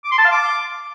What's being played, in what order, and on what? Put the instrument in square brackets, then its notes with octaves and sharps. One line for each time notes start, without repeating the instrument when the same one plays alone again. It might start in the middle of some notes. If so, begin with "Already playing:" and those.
[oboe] D6
C6
A5
F5
D6